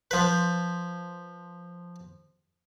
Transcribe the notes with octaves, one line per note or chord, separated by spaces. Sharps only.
F3 B4